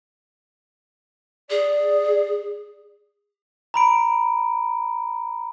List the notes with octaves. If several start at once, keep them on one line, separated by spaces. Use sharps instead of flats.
G#4 D5
A#5 B5 D7